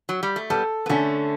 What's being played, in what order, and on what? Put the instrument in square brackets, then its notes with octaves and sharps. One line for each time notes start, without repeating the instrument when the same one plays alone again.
[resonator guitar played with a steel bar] F#3
G3
A3
[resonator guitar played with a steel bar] G3 B3 [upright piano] A4
[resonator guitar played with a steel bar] B3
[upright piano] D3 [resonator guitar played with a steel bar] A3 C#4